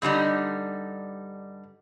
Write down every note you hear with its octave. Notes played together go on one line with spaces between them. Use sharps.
G2 D3 G3 D#4